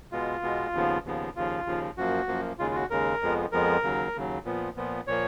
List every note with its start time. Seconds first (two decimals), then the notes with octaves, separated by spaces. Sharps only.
0.12 B2 G#3 B3 F4
0.43 B2 G#3 B3
0.73 D#2 C#3 F3 B3
1.05 D#2 C#3 F3 B3
1.36 D#2 C#3 F3 F4
1.66 D#2 C#3 F3
1.97 F#2 F3 A#3 F#4
2.28 F#2 F3 A#3
2.59 D#2 C#3 G#3 F4
2.71 F4
2.75 F#4
2.90 D#2 C#3 G#3 A#4
3.22 F2 F3 G#3 B3
3.52 F2 F3 G#3 B3 A#4
3.83 D#2 C#3 F#3
4.15 D#2 C#3 F#3
4.45 A#2 F3 B3
4.76 A#2 F3 B3
5.07 A#2 F3 A#3 C#5